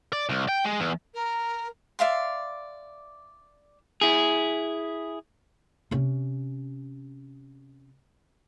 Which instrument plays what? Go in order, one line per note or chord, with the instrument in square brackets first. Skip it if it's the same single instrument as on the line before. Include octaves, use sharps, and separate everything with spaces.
[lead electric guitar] D5
C2
G5
G#3
E2
[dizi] A#4
[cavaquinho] D5 E5 F5 C6
[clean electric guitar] E4 G#4
[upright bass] C3 C#4